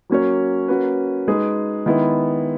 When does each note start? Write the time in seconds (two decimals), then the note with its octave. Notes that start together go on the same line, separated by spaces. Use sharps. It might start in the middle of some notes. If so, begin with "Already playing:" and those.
0.09 F#3 A#3 C#4 F#4 C#5
0.68 A#3 C#4 F#4 B4
1.28 G#3 D#4 G#4 B4
1.86 D#3 G#3 B3 E4